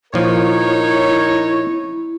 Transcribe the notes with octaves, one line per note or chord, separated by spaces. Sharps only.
A#2 F3 D#4 E4 A#4 C#5